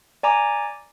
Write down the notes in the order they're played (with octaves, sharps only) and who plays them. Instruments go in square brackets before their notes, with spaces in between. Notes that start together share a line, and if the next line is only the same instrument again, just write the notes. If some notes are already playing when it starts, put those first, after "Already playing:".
[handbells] D5 G#5 A#5 D6